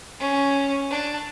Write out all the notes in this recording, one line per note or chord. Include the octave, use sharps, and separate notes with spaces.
C#4
D4